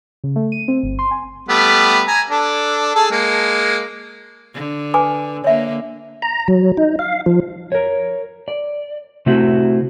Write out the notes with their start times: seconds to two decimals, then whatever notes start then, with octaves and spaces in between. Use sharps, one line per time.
0.24 C#3
0.36 A3
0.52 D#7
0.68 C4
0.83 G1
0.99 C6
1.11 G#5
1.49 G3 A3 B3
2.08 G#5 A#5
2.30 D4 A4
2.95 G#4 A4 A5
3.11 G#3 A#3
4.54 D3
4.94 B4 G#5 D6
5.44 D3 A#3 C#5 E5
6.22 A#5
6.48 F#3
6.77 D#4
6.99 F5
7.26 F3
7.72 A#4 C#5
8.48 D5
9.26 C3 A3 C4 E4 F#4